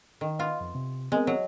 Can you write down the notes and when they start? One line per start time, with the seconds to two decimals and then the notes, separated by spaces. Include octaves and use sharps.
0.21 D#3
0.39 B3 F4 F5
0.61 F2
0.75 C3
1.12 G#3 B3 C4 A#4
1.27 F#3